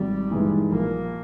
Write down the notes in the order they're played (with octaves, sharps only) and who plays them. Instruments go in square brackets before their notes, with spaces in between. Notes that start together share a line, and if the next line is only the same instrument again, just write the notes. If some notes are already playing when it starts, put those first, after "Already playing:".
Already playing: [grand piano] G#1 [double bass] G3
[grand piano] G2 E3 G#3 D#4
[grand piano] A#1 [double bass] A#3